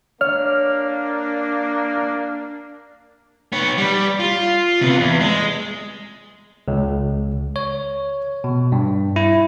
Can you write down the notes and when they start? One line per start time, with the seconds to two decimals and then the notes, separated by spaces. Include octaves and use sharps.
0.21 A#3 D4 C#5 F6
3.53 B3 C#5
3.78 G3
4.20 F4
4.81 C3 B3
4.99 E2
5.20 G#3
6.68 C#2
7.56 C#5
8.44 B2
8.72 G2
9.16 E4